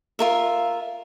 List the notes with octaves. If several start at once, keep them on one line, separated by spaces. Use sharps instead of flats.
F4 A#4 E5